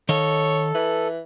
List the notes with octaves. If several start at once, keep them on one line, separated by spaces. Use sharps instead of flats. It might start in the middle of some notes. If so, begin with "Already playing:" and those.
D#3 A4 C#5 D#5 F5
E3 B4